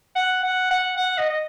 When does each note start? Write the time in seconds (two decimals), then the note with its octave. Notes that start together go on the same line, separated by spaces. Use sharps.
0.16 F#5
0.43 F#5
0.71 F#5
0.97 F#5
1.18 D#5
1.30 D#5